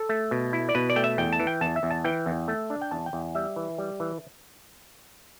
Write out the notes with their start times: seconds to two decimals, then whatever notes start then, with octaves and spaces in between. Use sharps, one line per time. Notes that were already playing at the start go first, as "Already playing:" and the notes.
Already playing: A4
0.09 A3
0.31 B2
0.53 E4
0.69 D5
0.75 B2 B4
0.90 D5
0.96 A3 G5
1.04 E5
1.18 E2 G5
1.33 A5
1.40 E3
1.47 G5
1.61 E2 A5
1.76 E5
1.83 E2
1.91 A5
2.04 E3 G5
2.26 E2
2.48 A3
2.70 D4
2.82 G5
2.91 E2 A5
3.06 G5
3.13 E2
3.35 G3 E5
3.56 E3
3.78 G3
4.00 E3